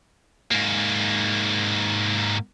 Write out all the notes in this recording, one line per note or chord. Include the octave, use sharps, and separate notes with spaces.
G#2 A#3